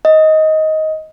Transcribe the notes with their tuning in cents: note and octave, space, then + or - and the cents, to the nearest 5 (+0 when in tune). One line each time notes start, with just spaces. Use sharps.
D#5 +15